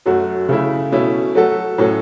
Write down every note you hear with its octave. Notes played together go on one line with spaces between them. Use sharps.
F#2 F#3 A3 F#4
C#3 A3 E4
B2 A3 C#4 E4
F#3 A3 F#4 A4
A2 F#3 C#4 A4